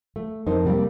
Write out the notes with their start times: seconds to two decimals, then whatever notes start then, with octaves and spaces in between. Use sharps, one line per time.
0.16 A3
0.46 F2 D#4 A#4 C5
0.65 C3 G3 A#3